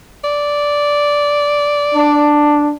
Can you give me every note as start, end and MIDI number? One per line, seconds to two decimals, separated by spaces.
0.24 2.32 74
1.95 2.72 62